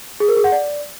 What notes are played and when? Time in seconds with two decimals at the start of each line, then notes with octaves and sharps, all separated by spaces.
0.20 G#4
0.28 A#4
0.36 G#4
0.44 F#5
0.52 D5